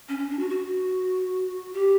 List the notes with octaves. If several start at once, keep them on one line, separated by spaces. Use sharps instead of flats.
C#4
C#4
D4
F#4
F#4
G4